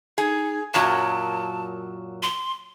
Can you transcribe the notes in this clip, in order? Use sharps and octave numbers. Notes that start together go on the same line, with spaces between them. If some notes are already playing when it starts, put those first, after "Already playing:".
D#4 G#4
F#2 A#2 F#3 A5
C6